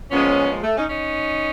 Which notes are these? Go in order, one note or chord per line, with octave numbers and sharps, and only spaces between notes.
A#2 F3 G#3 B3 C#4
G#3
A3
C#4 D#4
C#4 D#4